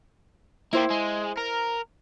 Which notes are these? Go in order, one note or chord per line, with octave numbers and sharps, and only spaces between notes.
A#3 E4 G4 C5
G#3
A#4